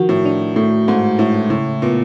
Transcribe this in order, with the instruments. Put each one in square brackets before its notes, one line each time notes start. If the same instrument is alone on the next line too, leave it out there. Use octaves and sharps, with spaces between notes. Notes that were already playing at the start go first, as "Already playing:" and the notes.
Already playing: [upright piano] D#3 [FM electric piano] F3 F#4
[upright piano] A2
[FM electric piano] D4
[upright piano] A2 [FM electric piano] A3
[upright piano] G#2 [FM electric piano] A4
[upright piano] A2 [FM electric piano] E4
[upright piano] A2 [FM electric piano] C#3
[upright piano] A#2 [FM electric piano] B3